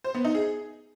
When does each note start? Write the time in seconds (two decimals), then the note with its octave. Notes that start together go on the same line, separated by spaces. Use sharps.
0.04 C5
0.15 B3
0.25 D#4
0.35 G#4